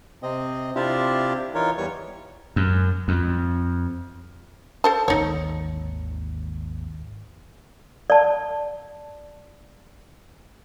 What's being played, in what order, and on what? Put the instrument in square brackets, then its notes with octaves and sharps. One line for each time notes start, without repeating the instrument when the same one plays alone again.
[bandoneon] C3 C4 D#5
C3 C4 D4 E4 F4 G4
E3 D#4 F4 A#4 C#5
E2 G3 C#5 C#6
[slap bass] F#2
F2
[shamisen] A4 C5 A5
[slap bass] G#1 D#2 D3 [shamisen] D#4 C#5
[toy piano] D5 A5